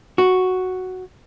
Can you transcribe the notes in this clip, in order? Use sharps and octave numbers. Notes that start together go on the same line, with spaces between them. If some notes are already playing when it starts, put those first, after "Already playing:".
F#4